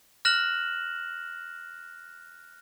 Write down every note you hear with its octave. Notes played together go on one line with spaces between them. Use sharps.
F6 F#6 A#6 E7 F#7